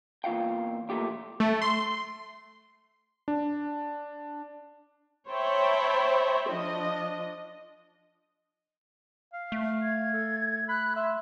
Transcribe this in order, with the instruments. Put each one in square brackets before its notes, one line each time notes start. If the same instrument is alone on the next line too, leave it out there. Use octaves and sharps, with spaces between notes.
[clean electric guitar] E2 A#2 F4 F5 G5
B1 E2 A#2 A3 G4
[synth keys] A3
C6
[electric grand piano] D4
[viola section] C5 C#5 E5 G5 A5 B5
F3 D4 D#5
[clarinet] F5
[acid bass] A3
[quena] G#6
[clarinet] A4
[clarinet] B5 [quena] F#6
[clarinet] E5 [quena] C6